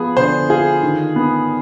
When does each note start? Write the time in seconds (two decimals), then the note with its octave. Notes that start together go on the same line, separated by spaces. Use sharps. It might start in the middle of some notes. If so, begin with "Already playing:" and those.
Already playing: F3 B3 G#4
0.17 D3 C5
0.50 F4 G#4
0.83 D#3
1.16 B3